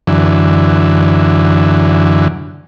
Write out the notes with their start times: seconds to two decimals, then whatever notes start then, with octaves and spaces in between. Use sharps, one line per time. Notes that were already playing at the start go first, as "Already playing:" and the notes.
0.07 F#2 D3 E3